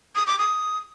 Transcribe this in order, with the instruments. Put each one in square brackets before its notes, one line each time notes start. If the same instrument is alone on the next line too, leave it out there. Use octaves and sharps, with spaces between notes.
[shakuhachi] D#6
D6
D#6